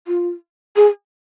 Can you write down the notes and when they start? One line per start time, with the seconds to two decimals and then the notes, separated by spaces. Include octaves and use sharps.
0.07 F4
0.76 G#4